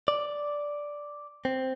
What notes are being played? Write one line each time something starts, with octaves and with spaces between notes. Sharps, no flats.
D5
C4